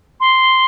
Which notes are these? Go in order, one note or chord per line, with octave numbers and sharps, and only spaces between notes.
C6